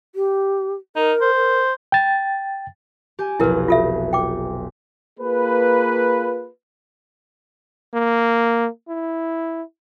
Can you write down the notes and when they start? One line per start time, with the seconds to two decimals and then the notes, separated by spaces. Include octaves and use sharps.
0.15 G4
0.96 D#4 A#4
1.21 C5
1.36 A#4
1.92 G5 A6
3.19 G4 G#5
3.39 F1 B1 E4 A#4 B4
3.68 F4 A4 E5
4.13 G5 D6
5.19 A#3 F4 G#4 B4
7.94 A#3
8.88 E4